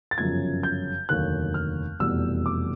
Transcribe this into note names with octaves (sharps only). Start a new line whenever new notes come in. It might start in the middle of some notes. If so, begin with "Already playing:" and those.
A6
G1 F#2 C#3 F3 G#6
G6
F1 D#2 D3 F#3 F#6
F6
F1 E2 B2 G3 E6
D6